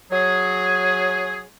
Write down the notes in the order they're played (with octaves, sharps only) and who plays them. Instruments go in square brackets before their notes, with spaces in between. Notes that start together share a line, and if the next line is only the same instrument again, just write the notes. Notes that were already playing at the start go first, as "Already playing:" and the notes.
[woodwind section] F#3 G#4